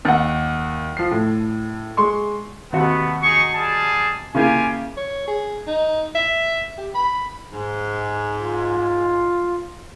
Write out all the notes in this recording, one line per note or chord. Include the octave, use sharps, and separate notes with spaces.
D#2 F#5
F3 C7
A2
G#3 C6 C#6
D#2 C3 A3 B3 F#4
D#4 G#4 C#6
G3 G#4 A5
C#3 A#3 E4 F4 G4 G#5
C#5
G#4
D#4
E5
G4
B5
G#2
F4